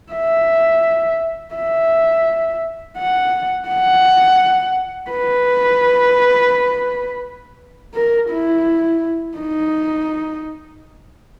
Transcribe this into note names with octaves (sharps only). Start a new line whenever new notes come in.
E5
E5
F#5
F#5
B4
A#4
E4
D#4